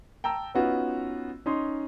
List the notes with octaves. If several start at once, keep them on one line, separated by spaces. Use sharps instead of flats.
G5 A5 A#5 E6
B3 C#4 D#4 F4 F#4 B4
C#4 D#4 C6